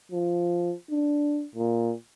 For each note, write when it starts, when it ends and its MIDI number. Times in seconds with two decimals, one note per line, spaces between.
0.12 0.73 53
0.90 1.46 62
1.55 1.93 46